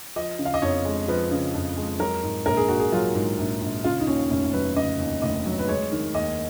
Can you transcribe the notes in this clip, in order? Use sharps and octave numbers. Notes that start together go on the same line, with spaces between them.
F3 D#5
C#3
F5
D#5
F2 C#5
G#3
F3 B4
C#3
F2
G#3
F#3 A#4
G#2
A#1 A#4
G#4
A#1 F#4
G#4
F#3 F4
G#2
A#1
A#1
C#3 F4
D#4
D#2 C#4
F1 C#4
F#3 B4
C#3 D#5
D#2
F1 D#5
F#3
B4
G#3 C#5
D#3
D#2 D#5